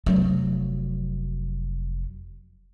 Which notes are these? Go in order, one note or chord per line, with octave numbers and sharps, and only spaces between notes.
F1 F#3